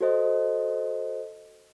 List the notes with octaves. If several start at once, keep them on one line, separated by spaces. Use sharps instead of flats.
F#4 A4 C5 D#5